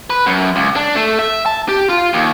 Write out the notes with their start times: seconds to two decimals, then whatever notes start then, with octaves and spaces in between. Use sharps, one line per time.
0.10 B4
0.26 F#2
0.56 C#2
0.76 D4
0.95 A3
1.19 E5
1.46 A5
1.69 G4
1.89 F4
2.13 D#2